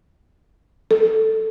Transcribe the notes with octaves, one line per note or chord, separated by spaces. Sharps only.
A4